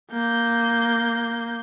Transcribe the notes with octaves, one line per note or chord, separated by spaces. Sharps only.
A#3 G6